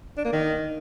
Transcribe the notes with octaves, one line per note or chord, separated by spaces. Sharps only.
D4
A#3
D#3